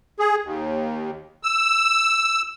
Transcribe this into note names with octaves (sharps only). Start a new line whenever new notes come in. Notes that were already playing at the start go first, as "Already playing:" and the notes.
G#4
D#2
E6